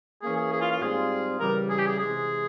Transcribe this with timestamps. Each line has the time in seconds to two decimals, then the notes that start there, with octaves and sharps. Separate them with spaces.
0.22 E3 A#3 C#4 G#4
0.37 G#4
0.52 G#4
0.61 F4
0.71 F4
0.82 G#2 G3 C4 F4 G#4
1.40 C#3 E3 G3 A#4
1.70 G#4
1.79 G4
1.86 G#4
1.99 C3 E3 G#3 G#4